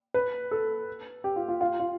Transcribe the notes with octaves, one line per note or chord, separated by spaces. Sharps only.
B4
A4
G4
F4
F4
F4
F4